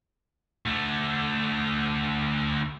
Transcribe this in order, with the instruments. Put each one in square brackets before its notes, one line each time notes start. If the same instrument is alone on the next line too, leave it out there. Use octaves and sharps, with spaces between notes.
[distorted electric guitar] D2 A3